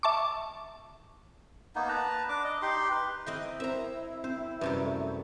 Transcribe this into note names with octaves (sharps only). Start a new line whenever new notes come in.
E5 A5 C#6 D6
A#3 B3 D#4
B4 A5 A#5
D4 D6
D#5
D#4 G4 C6
B4
C4 E4 D#5 G5
C4 A#4 C5 E5 A#5
C4 C5
F#2 C3 G3 B4
A3 E5 C#6